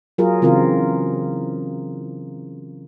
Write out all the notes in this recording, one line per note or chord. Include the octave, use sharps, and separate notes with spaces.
F#3 F4 G#4 A#4
C#3 E3 C4 F4 A#4